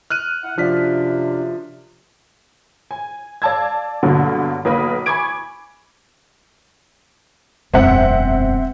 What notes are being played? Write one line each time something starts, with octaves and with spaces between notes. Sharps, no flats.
F6 F#6 D#7
E4 F#5
F#2 C3 F3 D4 D5 E5 F6 B6
G#5
D5 F5 A5 E6 G#6
G2 B2 D3 F#3 A#3
B1 A#3 B4 B5 D#6
G#5 B5 C#6 D6 G#6 D7
E1 F#2 C4 E5 F#5